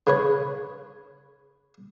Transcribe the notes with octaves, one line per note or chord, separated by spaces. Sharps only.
C#3 B4 C#5